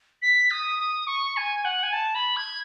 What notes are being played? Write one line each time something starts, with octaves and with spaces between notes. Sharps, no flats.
B6
D#6
D#6
C#6
G#5
F#5
G#5
A5
B5
G#6